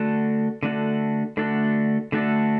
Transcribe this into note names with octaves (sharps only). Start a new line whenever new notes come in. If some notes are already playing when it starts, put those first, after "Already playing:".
Already playing: D3 A3 D4 F#4 A4
D3 A3 D4 F#4 A4
D3 A3 D4 F#4 A4
D3 A3 D4 F#4 A4